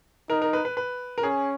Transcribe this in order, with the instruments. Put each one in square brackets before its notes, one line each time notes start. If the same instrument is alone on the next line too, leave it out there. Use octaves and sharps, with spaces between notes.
[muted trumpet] D#4 [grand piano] A#4
[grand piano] A#4
B4
B4
B4
A#4
[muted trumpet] C#4 [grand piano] G#4